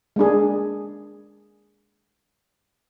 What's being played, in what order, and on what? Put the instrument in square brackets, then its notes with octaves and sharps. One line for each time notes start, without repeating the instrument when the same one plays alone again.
[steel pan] G#3 A#3 D4 G#4